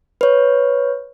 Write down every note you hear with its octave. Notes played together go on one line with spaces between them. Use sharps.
B4 C#5